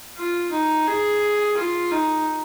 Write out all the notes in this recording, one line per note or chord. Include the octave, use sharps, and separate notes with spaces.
F4
D#4
G#4
F4
D#4